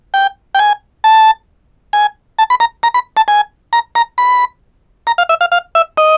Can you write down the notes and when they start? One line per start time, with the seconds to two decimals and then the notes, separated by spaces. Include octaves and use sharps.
0.14 G5
0.55 G5
0.59 G#5
1.04 A5
1.93 G#5
2.39 A5
2.50 B5
2.60 A#5
2.83 A#5
2.94 B5
3.17 A5
3.28 G#5
3.73 A#5
3.95 A#5
4.18 B5
5.07 A#5
5.18 F5
5.29 E5
5.41 F5
5.52 F5
5.75 E5
5.98 D#5